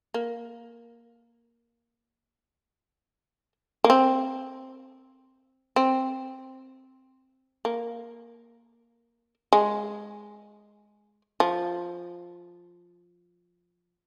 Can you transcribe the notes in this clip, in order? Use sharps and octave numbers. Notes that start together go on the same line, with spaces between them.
A#3
A#3
C4
C4
A#3
G#3
F3